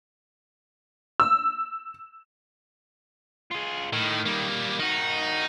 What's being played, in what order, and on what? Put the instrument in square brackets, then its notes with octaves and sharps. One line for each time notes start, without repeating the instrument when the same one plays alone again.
[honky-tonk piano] E6
[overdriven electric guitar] F4 G#4
[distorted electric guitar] A2 [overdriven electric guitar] D#3
[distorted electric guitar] G3 A#3
[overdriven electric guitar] D#3 F#4 [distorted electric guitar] D#4